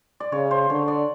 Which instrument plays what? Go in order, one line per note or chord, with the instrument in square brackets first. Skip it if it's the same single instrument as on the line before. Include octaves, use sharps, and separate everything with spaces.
[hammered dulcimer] D5
[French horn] C#3 [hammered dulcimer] C#5
[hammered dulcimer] C5
[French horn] D3 [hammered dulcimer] C#5
[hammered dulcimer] D5